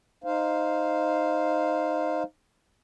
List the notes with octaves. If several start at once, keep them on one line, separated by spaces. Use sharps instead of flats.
D#4 C5 F5